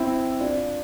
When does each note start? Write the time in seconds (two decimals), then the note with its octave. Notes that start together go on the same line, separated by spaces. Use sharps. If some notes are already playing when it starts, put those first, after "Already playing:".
Already playing: C4 E4
0.40 D4 F4